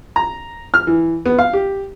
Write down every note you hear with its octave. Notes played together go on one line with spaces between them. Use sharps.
A#5
F6
E3
B3
F5
G4